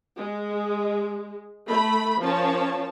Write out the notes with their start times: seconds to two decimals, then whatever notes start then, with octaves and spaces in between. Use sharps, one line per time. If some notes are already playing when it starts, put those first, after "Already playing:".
0.18 G#3
1.68 A3 B5
2.21 F3 C#4 A#4 C#5 A5